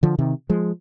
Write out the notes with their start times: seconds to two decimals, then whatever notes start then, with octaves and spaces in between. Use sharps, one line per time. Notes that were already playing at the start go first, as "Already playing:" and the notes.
0.03 D3 F3
0.19 C3 D#3
0.49 F3 G#3